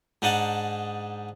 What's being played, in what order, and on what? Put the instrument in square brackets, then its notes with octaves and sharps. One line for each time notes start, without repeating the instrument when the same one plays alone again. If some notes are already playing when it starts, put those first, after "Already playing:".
[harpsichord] G#2 D4 D#4 D#5 F#5 A5